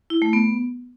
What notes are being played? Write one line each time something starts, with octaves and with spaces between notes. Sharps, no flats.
E4
A3
B3